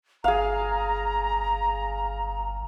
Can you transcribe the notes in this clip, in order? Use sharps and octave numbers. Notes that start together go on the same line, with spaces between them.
G1 G#4 F5 A#5